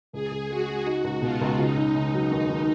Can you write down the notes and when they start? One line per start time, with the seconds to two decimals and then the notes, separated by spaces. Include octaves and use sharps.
0.13 C#2 G#4
0.31 C#2
0.49 G#3 F#4
0.68 G#3
0.86 D#4
1.04 C#2
1.22 B2 F4
1.41 C#2
1.59 C#3 D#4
1.77 C#3
1.95 C#3
2.13 F#3
2.31 D#2
2.49 D#2